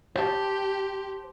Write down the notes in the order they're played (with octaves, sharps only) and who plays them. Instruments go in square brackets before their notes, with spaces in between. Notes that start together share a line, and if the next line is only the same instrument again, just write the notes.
[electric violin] G4 [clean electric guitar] C5 A5